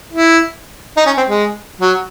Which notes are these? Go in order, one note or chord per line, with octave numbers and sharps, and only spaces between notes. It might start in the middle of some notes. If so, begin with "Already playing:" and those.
E4
D#4
C#4
C4
G#3
F#3